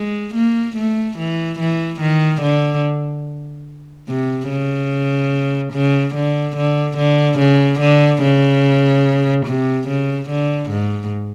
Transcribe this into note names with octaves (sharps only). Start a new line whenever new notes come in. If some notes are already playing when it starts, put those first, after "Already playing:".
Already playing: G#3
A#3
A3
E3
E3
D#3
D3
C3
C#3
C#3
D3
D3
D3
C#3
D3
C#3
C3
C#3
D3
G#2